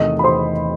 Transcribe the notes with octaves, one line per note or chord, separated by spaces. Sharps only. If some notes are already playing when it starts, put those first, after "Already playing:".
Already playing: E2 C3 D#3 A3 D#5 D#6
B5
C5 C6